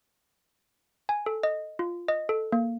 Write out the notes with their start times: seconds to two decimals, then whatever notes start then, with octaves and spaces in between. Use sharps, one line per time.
1.09 G#5
1.26 A4
1.43 D#5
1.79 F4
2.08 D#5
2.29 A4
2.52 A#3